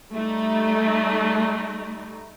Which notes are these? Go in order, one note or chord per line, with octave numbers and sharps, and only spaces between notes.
G3 A3 D#4